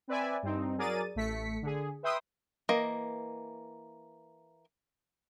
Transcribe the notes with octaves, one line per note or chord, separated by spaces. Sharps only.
C4 B4 D5 E5 G#5
G2 C4 D#4
F#3 G#4 A#4 D5 A6 D#7
A1 A3 B6 C#7
D3 G#4
B4 E5 G5 C6 D#6 E6
E3 A#3 D#5